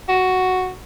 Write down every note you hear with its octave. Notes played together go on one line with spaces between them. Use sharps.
F#4